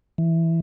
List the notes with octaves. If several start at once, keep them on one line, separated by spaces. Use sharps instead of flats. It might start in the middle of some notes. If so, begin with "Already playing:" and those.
E3